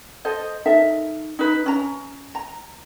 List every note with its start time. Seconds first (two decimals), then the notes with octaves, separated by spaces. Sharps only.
0.25 A4 C5 D#5
0.66 D#4 A4 A#4 E5
1.39 D#4 B4
1.66 C#4 A#5
2.35 A#5